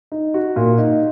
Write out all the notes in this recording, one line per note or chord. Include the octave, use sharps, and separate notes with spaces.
D#4
F#4
A#2
D#4